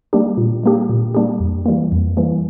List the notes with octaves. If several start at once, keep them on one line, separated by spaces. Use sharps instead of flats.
G3 A#3 D4 G4
A#2
G3 A#3 D4 G4
A#2
G3 A#3 D4 G4
F2
E3 G3 A#3
F2
E3 G3 A#3